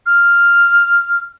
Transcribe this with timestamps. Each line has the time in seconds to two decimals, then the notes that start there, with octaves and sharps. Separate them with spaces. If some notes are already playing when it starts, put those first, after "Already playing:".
0.06 F6